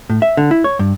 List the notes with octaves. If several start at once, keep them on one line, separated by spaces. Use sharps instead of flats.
A2
E5
D3
E4
C#5
G2